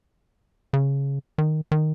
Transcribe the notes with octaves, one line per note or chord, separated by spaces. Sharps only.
C#3
D#3
D#3